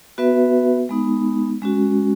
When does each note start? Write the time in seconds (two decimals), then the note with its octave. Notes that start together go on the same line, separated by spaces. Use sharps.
0.18 B3 F#4 B4 E5
0.89 G#3 B3 D#4
1.62 G#3 C#4 F#4